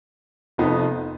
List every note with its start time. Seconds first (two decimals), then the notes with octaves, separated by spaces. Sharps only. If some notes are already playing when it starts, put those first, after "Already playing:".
0.58 F1 F2 F3 B3 D#4